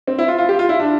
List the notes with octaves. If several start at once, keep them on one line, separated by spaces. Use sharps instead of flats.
C4
E4
F4
F4
G4
F4
E4
D4